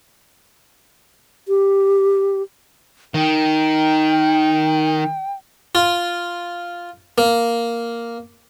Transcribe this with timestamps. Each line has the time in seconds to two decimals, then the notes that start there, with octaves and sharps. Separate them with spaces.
1.48 G4
3.14 D#3 G5
5.75 F4
7.18 A#3